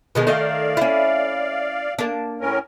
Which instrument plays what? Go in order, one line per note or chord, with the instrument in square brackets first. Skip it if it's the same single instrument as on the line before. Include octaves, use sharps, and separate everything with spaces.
[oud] B2 D#3 G#3
[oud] D#3 A3 D#4 [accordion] D5 F5
[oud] C#4 E4
A#3 D4
[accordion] A2 C#4 A#4